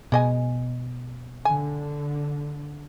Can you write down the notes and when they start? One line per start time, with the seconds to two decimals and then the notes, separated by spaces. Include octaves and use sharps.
0.12 B2 G#3 D#5 G#5
1.45 D3 G#5